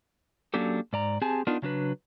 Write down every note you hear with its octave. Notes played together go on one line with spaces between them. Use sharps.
F#3 A#3 C#4 D4 G4 A4
G#2 D5 A#5
C4 G4 G#4 G#5 A5
B3 D4 D#4 F4 A#4
C#3 F#3 D4 B4